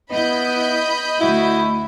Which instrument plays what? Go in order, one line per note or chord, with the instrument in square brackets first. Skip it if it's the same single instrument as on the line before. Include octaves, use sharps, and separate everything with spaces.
[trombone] B3 [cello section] E4 [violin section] D#5 B5 G6
[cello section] D2 [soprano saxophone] E4 [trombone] F#4